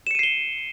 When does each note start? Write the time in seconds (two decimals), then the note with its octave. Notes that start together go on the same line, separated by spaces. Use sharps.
0.07 E7
0.11 C#7
0.15 D#7
0.19 C7
0.23 G7